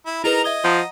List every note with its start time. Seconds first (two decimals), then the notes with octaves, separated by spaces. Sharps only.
0.06 E4
0.24 D#4 E4 G#4 A#4 B4 A#5
0.44 D#5 E5 G#6 G7
0.64 F3 F#5 A#5